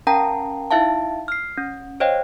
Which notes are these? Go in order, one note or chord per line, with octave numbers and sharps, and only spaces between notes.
C#4 A#4 F5 G5 A5 A#5
D#4 E4 E5 F5 A5
F6 C7
C#4
C5 C#5 D#5 F5 G5